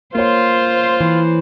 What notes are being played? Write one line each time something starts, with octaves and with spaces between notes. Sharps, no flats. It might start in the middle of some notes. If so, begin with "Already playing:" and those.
A#3 F4 C5 C#5
E3